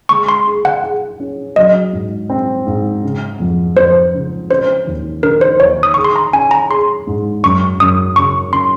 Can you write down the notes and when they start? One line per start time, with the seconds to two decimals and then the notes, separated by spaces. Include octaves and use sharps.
0.09 G#3 C#6
0.29 C6
0.47 G#4
0.65 F#5
0.84 G#4
1.20 C#4
1.56 F#3 D#5
1.93 G#2
2.30 C4
2.66 G#2
3.03 C#3
3.40 F2
3.76 F2 C5
4.13 C#3
4.50 C#4 C5
4.87 D#2
5.23 D#3 A#4
5.41 C5
5.60 D#2 C#5
5.83 D#6
5.94 G#4 C#6
6.04 C6
6.16 A#5
6.33 C#4 G#5
6.51 A#5
6.70 G#4 C6
7.07 G#2
7.43 F#2 C#6
7.80 F#2 D#6
8.16 C#3 C#6
8.53 C#4 C6